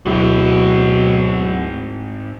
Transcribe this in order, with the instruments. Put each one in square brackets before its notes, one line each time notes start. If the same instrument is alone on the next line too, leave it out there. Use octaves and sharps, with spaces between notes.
[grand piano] D1 E4 [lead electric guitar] G#2 C4 [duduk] B2 [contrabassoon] F#3